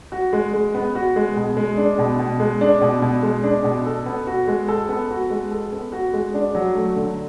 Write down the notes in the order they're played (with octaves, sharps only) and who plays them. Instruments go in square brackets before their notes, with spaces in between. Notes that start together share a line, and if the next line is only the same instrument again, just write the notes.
[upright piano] F#4
G#3
G#3
B3
F#4
G#3
B2
G#3
D4
B2
B2
G#3
D4
B2
B2
G#3
D4
B2
A4
B3
F#4
G#3
A4
B3
F#4
G#3
A4
B3
F#4
G#3
D4
F#3
A3
D3